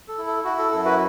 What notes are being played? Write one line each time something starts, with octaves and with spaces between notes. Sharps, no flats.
A4
E4
A4
E4 F#4
A4
F#2 A4
F#4 B4